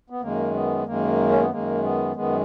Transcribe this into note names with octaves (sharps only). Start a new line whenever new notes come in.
B3
F#2 D#3 G#3 A#3
B3
F#2 D#3 G#3 A#3
C#4
B3
F#2 D#3 G#3 A#3
B3
F#2 D#3 G#3 B3